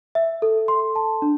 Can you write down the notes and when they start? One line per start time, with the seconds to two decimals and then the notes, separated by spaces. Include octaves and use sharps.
0.15 E5
0.42 A4
0.68 C6
0.96 A5
1.22 D4